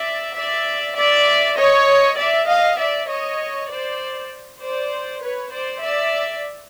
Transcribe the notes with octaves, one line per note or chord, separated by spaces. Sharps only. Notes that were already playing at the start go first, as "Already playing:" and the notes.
Already playing: D5 E5
D5 E5
D5 E5
C#5 D#5
D5 E5
D#5 F5
D5 E5
C#5 D#5
C5 D5
C5 D5
B4 C#5
C5 D5
D5 E5